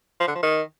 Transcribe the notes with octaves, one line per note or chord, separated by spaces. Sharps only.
F3
D3
F3
D#3